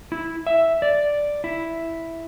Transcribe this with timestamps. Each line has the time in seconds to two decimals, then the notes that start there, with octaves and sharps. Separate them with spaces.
0.12 E4
0.47 E5
0.82 D5
1.44 E4